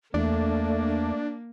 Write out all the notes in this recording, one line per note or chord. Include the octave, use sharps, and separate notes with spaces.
E2 A3 A#3 D4